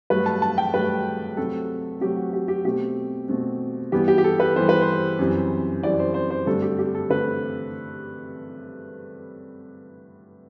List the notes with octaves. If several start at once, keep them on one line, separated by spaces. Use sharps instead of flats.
G2 F#3 A3 B4
A5
A5
G5
G2 F#3 A3 B4
C3 F#3 A3 A4
C3 F#3 A3 G4
F#4
G4
G4
B2 A3 C4 G4
B2 A3 C4
G2 E3 G3 B3 G4
G4
G4
A4
B4
G2 E3 G3 B3 C5
B4
C5
F#2 E3 G3 C4
F#2 E3 G3 C4 D5
C5
C5
C5
G2 D3 A3 C4 A4
G4
G4
A4
D3 A3 C4 B4